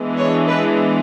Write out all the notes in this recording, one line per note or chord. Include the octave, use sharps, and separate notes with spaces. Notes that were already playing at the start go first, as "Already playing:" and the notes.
Already playing: E3 G#3 B3 D4
C#5
B4